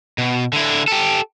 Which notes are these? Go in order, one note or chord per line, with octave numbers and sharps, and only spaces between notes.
B2
D3 E4
G4 A4